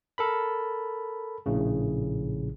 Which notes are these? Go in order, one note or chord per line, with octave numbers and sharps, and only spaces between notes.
A4 A#4 B5
A#1 A2 C#3